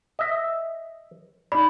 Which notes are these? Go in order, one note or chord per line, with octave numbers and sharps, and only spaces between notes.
D#5 E5
D#4 D5 B5